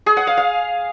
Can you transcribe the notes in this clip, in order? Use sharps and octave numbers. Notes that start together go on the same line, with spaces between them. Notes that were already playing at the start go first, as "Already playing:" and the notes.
G#4
F#5
F5
F5